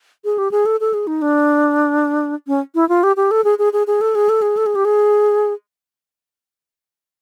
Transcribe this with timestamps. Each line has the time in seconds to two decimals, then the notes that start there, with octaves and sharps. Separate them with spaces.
0.25 G#4
0.38 G4
0.51 G#4
0.66 A4
0.80 A4
0.94 G#4
1.07 D#4
1.22 D4
2.47 C#4
2.75 E4
2.89 F4
3.03 G4
3.17 G4
3.31 A4
3.44 G#4
3.59 G#4
3.73 G#4
3.87 G#4
4.01 A4
4.15 G#4
4.29 A4
4.42 G#4
4.57 A4
4.66 G#4
4.75 G4
4.85 G#4